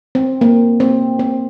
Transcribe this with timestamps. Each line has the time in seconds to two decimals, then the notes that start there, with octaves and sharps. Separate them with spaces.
0.15 C4
0.41 A#3
0.80 C4
1.19 C4